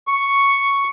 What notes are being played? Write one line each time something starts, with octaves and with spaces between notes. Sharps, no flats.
C#6